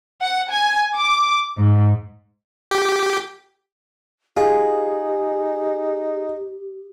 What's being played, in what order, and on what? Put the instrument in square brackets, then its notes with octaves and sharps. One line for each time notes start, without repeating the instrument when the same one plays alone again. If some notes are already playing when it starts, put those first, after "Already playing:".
[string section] F#5
G#5
D6
G#2
[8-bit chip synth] G4
[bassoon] D#4 [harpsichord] F4 [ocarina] G4 [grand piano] G#4